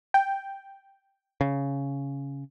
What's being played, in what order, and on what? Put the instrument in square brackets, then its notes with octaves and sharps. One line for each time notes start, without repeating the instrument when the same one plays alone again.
[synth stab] G5
[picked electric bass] C#3